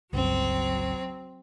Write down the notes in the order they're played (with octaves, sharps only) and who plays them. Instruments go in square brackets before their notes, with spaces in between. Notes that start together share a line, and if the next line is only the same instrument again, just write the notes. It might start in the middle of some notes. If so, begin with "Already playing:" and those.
[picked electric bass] G1 C#2 [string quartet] F#3 C4